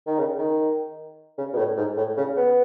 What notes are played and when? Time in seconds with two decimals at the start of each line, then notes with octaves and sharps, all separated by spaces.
0.07 D#3
0.18 C#3
0.38 D#3
1.38 C#3
1.53 B2
1.58 A2
1.77 G#2
1.97 A2
2.17 C#3
2.37 B3